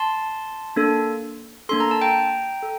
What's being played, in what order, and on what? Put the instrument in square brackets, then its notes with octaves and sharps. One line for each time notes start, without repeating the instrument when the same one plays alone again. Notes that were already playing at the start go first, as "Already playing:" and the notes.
Already playing: [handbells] A5 C6
A#3 D4 A4
A#3 D4 A4 C6
A#5
A5
G5 A#5
A4